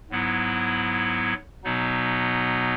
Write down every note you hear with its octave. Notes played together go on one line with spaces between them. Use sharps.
G#2 F#3 B3 E4
B2 F#3 B3 D#4